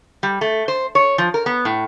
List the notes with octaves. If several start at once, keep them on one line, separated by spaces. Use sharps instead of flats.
G3
A3
C5
C#5
F3
A#4
B3
A2